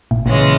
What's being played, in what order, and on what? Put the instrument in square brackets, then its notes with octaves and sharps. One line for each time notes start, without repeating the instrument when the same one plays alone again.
[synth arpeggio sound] A#1 A#2
[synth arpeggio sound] A#1 A#2 [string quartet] C#3 E3 G#3 C#4